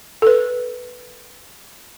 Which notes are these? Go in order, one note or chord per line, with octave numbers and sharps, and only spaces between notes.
A4 B4